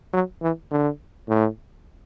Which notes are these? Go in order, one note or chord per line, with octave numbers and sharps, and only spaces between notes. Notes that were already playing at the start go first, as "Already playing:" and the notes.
F#3
E3
D3
A2